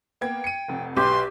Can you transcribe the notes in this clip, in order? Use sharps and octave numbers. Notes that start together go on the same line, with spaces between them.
A#3 B3 G5 G#6
C#7 D#7
F1 F2
B1 G4 B4 C6